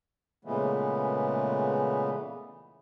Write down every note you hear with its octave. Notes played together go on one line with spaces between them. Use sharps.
A#2 C#3 E3 G#3 A3 B3